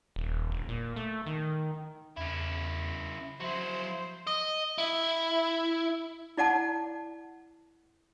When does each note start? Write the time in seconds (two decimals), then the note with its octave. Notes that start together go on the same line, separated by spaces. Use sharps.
0.16 D#1
0.50 E1
0.69 A#2
0.96 A3
1.26 D#3
2.17 E2 C#3 E4
3.40 F3 F#3 E4 C5
4.27 D#5
4.78 E4
6.37 E4 D5 F#5 A5